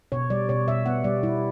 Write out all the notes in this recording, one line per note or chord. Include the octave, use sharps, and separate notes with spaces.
B2 C#5
G3 D5
B2 C#5
B2 E5
B3 F#5
G3 D5
G3 E4